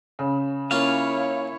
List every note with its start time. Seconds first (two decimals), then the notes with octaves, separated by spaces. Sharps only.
0.19 C#3
0.71 A#3 C#4 E4 F4 C#5 F5